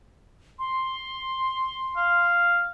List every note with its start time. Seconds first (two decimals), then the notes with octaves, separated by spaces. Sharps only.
0.59 C6
1.97 F5